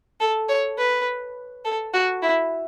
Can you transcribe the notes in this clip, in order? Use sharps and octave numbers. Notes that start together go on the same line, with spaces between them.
A4
C#5
B4
A4
F#4
E4